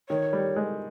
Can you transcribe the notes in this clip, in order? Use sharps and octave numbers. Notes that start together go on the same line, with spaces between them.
D#3 C#5
G3
G#3